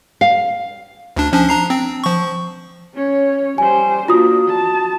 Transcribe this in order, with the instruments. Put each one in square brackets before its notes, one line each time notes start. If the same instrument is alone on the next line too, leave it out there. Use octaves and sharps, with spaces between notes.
[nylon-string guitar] F5
[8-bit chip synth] D2 D4
F3 C#4 D4
D4 A#5 C7
C4
F3 C#6
[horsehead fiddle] C#4 C#5
[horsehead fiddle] G3 C5 [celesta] G#5
[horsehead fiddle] A#3 D4 [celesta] F4 F#4 D#6
[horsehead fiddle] A5